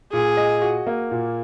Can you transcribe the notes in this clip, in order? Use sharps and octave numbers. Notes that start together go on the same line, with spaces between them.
A#2 G#4
D#5
F#4
A#3
A#2